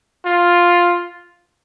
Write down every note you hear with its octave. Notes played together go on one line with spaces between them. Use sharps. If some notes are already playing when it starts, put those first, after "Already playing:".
F4